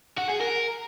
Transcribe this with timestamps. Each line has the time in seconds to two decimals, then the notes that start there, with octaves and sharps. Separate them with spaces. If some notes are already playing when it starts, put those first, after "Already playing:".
0.18 F#4
0.30 G#4
0.41 A#4